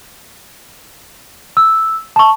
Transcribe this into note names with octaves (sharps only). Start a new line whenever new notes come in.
E6
A5 C#6